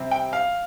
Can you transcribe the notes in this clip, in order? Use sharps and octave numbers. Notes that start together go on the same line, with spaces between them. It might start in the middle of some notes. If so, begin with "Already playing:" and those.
Already playing: C3 G3 C4
G5
F5